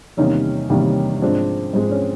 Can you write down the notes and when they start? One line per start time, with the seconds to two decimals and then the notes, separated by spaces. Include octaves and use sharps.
0.17 E2 C3 D#3 G3 A#3 C#4 D#4
0.70 E2 C3 D#3 G3 A#3
1.22 G#2 F3 G#3 C4 D4
1.74 G#2 F3 G#3 C4
1.91 C#4